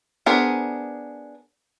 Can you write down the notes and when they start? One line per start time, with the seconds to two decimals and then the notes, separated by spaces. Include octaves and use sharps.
0.26 B3 D4 G#4 A#4 C5